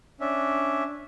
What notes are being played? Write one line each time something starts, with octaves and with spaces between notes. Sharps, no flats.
C#4 D4 E5